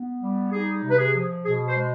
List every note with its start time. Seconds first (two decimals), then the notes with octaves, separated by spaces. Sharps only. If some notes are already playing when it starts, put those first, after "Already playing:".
Already playing: B3
0.22 G3
0.52 D#4 G#4
0.83 C3
0.90 B4
0.98 G#4
1.15 F3
1.45 B2 G#4
1.68 C5
1.76 G#3